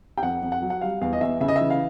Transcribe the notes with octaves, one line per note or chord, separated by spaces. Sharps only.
G5
F2 F#5
F2
F#5
F#3
F#5
G3 F5
E2 F5
D#5
E2 E5
C#3 E5
D#5
E3 E5
F5